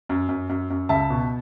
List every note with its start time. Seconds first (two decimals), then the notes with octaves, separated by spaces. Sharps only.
0.09 F#2
0.29 F#2
0.49 F#2
0.70 F#2
0.89 C#2 E5 A5
1.10 B2